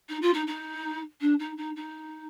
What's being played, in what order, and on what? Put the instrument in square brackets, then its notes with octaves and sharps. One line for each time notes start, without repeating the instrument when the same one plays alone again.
[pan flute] D#4
F4
D#4
D#4
D4
D#4
D#4
D#4